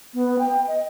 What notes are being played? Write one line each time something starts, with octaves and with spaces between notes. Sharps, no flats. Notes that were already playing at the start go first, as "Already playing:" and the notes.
B3
G5
D#5